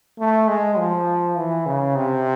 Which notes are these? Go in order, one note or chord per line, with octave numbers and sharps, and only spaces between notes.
A3
G#3
F3
E3
C#3
C3